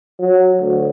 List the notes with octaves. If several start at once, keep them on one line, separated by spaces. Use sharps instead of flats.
F#3
D2